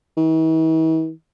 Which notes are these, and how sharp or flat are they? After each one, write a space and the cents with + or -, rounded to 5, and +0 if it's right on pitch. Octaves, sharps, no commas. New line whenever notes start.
E3 -45